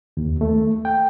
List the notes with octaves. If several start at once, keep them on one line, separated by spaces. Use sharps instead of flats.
D#2
A3
G5